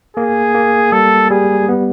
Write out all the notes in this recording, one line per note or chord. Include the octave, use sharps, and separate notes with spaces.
A#3 G#4
A#3
G3 A4
G3 G#4
B3